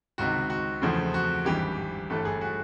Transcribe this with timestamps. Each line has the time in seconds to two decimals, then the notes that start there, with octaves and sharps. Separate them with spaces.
0.18 C#2 C3 D#3 F#4
0.50 F#4
0.82 E2 C#3 F3 A3 C4
1.14 F#4
1.45 G#1 G2 E3 G4
2.10 G1 G2 E3 A3 A4
2.25 G#4
2.41 F#4